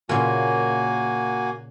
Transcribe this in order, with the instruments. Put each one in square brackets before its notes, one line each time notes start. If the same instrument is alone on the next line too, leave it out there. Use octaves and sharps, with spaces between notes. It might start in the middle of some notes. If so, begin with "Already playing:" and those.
[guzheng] A#2 C#3 [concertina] A#3 F#4 G#5